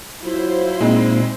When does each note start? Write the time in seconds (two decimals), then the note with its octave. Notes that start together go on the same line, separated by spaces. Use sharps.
0.22 F#3 E4 F4 C5 C6
0.81 A#2 G#3 C4 D#4